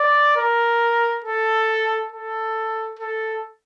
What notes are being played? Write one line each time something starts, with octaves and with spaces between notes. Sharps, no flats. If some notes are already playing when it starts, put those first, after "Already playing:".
Already playing: D5
A#4
A4
A4
A4